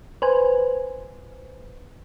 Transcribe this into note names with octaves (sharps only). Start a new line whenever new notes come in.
B4 C5 G#5